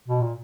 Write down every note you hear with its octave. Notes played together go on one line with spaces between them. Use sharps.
B2
A#2